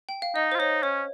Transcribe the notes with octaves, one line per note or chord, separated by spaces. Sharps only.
G5
F5
D#4 D#5
C5
F4
D#4 C#5
C#4 C#5